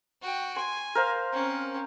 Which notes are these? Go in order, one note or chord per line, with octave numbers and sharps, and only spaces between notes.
F#4 G5
G#5 C6
A#4 C5 F5
C4 C#4